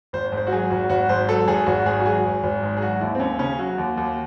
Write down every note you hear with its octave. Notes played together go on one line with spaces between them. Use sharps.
G#1 C5
G#2
C5
F#4
F#3 G#4
G#1 F#4
G#1 F#4
G#2 C5
F#3 A4
G#1 G#4
G#1 F#4
G#2 G#4
F#4
F#3 G#4
G#1
G#1
G#2
G#4
F#3 F#4
D#2 E4
C4
D#2 C#4
C4
C#3 C#4
F#3 F#4
D#2
D#2